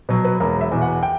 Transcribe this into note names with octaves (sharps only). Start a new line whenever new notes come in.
B2 F#3
B4
E1 A#4
E5
E2 B2
F#5
G5